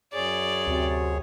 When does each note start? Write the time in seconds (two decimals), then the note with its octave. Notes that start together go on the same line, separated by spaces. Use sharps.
0.14 F#2 G#4 C#5 D5
0.67 D2 C3 F#4